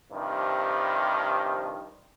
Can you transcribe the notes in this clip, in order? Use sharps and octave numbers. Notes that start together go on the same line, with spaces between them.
G2 C3 D#3 F3